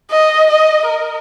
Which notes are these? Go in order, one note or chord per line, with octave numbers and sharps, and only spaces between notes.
D#5
D#5
A#4